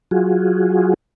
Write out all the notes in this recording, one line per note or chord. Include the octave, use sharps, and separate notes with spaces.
F#3 F4 F#4 G#4